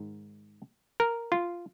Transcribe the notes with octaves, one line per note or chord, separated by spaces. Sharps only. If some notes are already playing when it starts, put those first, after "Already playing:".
Already playing: G#2 D#3
A#4
F4